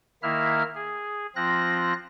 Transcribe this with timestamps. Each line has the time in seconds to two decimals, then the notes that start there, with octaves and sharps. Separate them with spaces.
0.23 D#3 A#3 E4 E5 F6
0.75 G#4
1.36 F3 C4 F4 F#6 A#6